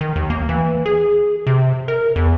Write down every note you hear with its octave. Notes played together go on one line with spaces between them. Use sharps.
D#3
D#2
A#3
E3
G#4
C3
A#4
E2